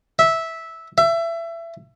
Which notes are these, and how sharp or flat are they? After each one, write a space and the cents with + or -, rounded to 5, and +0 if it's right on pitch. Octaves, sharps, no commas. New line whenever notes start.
E5 -10
E5 +25